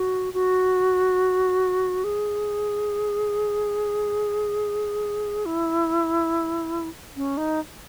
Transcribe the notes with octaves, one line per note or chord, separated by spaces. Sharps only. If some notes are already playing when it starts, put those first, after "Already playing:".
Already playing: F#4
F#4
G#4
E4
C#4
D#4